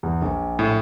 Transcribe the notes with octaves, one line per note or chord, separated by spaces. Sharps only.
E2
A#1
A2